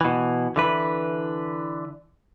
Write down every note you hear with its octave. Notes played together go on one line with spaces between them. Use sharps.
B2 E3
D3 E3 B4